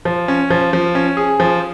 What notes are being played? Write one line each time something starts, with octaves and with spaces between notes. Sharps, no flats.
F3
C#4
F3
F3
C#4
G#4
F3